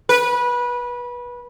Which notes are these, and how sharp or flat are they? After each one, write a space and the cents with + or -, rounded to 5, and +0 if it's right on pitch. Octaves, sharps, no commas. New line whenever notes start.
B4 -20